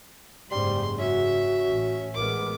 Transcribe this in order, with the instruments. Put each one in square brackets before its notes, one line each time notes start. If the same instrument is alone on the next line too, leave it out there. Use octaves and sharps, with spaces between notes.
[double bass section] F#1 G#2 C#3 [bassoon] G3 [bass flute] C5 [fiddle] C6
[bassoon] C#4 [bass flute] F#4 [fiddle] E5
[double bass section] A1
[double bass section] A1 G#3 B3 [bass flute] A#4 [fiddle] D6